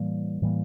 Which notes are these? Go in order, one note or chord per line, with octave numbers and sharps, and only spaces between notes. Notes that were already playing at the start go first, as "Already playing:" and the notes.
Already playing: A2 E3 G3 A#3
A2 E3 G3 A#3